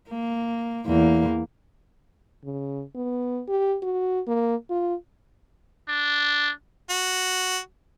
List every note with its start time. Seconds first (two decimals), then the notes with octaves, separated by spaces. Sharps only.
0.10 A#3
0.86 E2 A#3
2.45 C#3
2.95 B3
3.48 G4
3.83 F#4
4.27 A#3
4.70 F4
5.89 D4
6.90 F#4